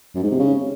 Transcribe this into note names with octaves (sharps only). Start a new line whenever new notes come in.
F#2
G#2
C3
C#3